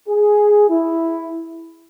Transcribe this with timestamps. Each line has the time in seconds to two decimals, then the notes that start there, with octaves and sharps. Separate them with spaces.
0.08 G#4
0.69 E4